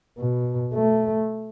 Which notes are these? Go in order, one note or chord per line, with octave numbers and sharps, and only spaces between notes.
B2
A3